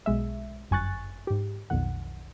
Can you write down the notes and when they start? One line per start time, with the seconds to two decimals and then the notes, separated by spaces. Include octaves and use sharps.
0.06 B1 G#3 E5
0.71 G1 F#2 G#5 C#6 F#6 A6
1.27 G#2 G4
1.70 B1 F2 D#3 F#5